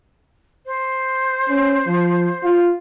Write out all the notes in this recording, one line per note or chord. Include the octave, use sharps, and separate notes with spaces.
C5
C#4
F3
F4